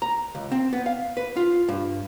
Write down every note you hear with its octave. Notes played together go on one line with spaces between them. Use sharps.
A#5
C#2
C4
B3
F5
B4
F4
G2